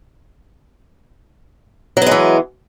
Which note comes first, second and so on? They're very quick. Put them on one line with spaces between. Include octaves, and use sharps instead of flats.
F#3 B3 G#3 E3